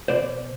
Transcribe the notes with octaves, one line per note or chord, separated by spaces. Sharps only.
B2 C5 D5